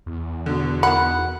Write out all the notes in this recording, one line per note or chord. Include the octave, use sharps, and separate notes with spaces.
E2
B2 D3
D#3 F#5 B5